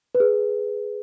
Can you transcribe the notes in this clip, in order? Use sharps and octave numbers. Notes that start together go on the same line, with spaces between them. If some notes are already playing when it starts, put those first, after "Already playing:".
B4
G#4